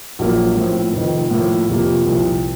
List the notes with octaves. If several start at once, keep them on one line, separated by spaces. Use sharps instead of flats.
A#1 A#2 F#3 A#3
A2 F3 C4
F1 F2 D#3
A2 F3 A#3
F1 F2 C3 F3 A#3
C2 A#2 F3